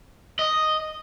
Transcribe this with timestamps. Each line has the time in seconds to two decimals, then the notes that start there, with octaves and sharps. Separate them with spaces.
0.39 D#5